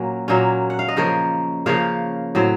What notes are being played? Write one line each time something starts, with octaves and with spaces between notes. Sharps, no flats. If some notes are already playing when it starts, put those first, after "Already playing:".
Already playing: A#2 F#3 A#3 C#4 A#4
A#2 F#3 A#3 C#4
F#5
F5
D#5
C#3 F3 A#3 A#4 C#5
C#3 F3 A#3 C#5 F5
A2 F#3 C4